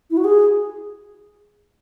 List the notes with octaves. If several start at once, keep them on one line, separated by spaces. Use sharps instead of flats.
E4
F#4
G#4